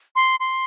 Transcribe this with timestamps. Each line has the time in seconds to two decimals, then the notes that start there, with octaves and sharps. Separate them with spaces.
0.16 C6
0.40 C6